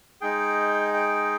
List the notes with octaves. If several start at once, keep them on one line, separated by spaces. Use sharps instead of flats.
G#3 D#4 G#4 G5
G5